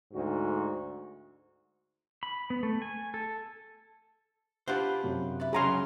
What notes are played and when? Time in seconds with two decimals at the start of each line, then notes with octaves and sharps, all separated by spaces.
0.13 D2 G#2 F#4
2.23 B5
2.50 B3
2.63 A3
2.82 G#5
3.14 A4
4.68 D4 F4 G4 B4 C5 F#5 B5
5.03 F#2 C3
5.40 E4 B4 D5
5.53 C#2 F#3 C#4 G#4 A#5 C6